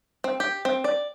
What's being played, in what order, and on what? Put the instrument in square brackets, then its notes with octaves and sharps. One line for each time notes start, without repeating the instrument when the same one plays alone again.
[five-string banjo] C4
G4
C4
D5